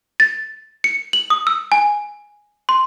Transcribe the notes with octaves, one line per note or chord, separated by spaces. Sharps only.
A6
C#7
F#7
D#6
E6
G#5
C6